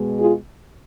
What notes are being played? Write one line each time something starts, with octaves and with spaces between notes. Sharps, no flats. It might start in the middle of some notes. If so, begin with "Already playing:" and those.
Already playing: B2 G#3
F4 G#4